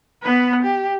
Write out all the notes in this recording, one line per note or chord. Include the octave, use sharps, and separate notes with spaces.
B3 B4
G4